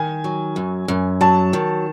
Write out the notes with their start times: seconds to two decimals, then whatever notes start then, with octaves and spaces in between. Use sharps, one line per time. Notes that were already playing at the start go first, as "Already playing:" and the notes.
Already playing: D#3 G#5
0.24 F#3
0.56 F#2
0.88 F#2
1.21 F#3 A5
1.53 D#3